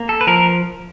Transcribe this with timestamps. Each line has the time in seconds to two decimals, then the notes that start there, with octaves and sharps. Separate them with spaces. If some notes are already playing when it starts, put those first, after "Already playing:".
Already playing: A#3
0.09 A4
0.21 B4
0.27 F3 A#4